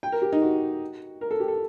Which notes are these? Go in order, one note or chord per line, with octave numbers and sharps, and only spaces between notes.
G5
A#4
G4
D#4
F#4
A#4
A4
G4
A4